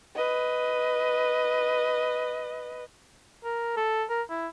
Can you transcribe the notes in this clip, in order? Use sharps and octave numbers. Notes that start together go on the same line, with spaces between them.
B4 D#5
A#4
A4
A#4
E4